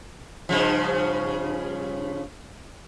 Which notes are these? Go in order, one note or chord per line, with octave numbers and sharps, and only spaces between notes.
G2 C#3 F3